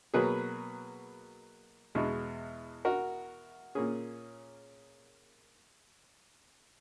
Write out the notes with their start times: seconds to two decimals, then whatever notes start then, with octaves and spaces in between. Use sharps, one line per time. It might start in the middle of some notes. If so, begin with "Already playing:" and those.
0.14 B2 F#3 A#3 G#4 B4
1.95 E2 B2 G#3
2.85 F#4 A#4
3.75 A#2 A#3 C#4 G#4